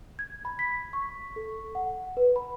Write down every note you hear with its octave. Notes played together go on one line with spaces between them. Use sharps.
G#6
B5
B6
C#6
A4
F#5
B4
B5